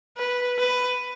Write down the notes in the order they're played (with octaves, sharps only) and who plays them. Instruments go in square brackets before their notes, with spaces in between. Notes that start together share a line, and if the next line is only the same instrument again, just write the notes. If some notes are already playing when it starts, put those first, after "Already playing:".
[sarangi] B4
B4